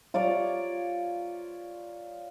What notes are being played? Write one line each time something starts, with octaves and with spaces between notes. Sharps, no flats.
F4 C#5 D5 A#5